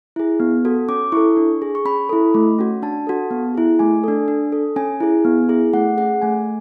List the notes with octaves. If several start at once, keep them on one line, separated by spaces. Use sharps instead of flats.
E4 G#4
B3
F#4 A4
C#4 D6
E4 A4 C#6
D4
G#4
C#6
C#4 B5
E4 A4
A3
C#4 F#4
D4 A5
F#4 A4
B3
E4 G#4
A3 G#5
D4 A4
D4
A4
C#4 G#5
E4 G#4
B3
E4 G#4
A3 F#5
C#4 G#4 F#5
A3 G#5